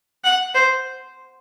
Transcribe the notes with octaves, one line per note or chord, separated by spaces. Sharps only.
F#5
C5